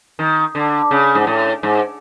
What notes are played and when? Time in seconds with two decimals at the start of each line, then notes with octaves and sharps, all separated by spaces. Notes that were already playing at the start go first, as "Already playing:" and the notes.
0.19 D#3
0.55 D3
0.91 C#3
1.15 G#2
1.27 A2
1.63 G#2